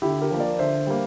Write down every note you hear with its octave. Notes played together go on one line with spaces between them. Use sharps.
D3 E4 G4
G4 A#4
F3 A#3
A#4 D5
D3 C5 E5
G3 A#3